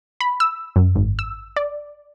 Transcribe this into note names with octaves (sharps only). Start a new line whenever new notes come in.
B5
E6
F#2
G#1
E6
D5